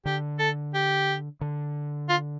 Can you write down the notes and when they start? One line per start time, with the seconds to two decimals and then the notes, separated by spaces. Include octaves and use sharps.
0.05 D3 G4
0.39 A4
0.74 G4
1.41 D3
2.09 F4